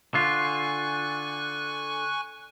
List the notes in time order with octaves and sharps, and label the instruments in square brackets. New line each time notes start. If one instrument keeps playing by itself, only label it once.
[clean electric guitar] D3 F4 [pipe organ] G#5 C#6 F#6